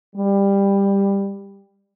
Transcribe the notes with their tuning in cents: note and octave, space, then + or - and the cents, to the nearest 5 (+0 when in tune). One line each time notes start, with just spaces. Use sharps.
G3 +15